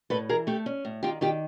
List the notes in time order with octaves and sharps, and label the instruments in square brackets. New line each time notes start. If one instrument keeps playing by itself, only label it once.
[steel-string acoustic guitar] A2 A4 B4
E3 G#4 A#4
A3 G4 A4
C#4
A2
D#3 F4 G4
D#3 F4 G4